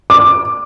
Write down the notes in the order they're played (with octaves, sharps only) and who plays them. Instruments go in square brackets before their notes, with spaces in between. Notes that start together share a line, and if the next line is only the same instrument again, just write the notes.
[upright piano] D6